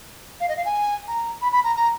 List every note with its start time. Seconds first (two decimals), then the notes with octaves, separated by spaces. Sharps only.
0.40 F5
0.49 D#5
0.56 F5
0.65 G#5
1.08 A#5
1.41 B5
1.52 B5
1.64 A#5
1.76 A#5